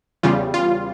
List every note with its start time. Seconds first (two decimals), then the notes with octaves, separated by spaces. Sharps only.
0.23 E2 C#3 G3 F4
0.54 F4